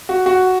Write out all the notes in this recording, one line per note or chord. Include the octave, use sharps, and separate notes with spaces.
F#4
F#4